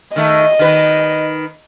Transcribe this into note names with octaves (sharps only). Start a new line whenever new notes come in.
D#3 A3 D#5
D#3 B4